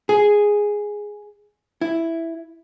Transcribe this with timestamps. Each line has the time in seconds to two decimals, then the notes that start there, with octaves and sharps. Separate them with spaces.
0.09 G#4
1.81 E4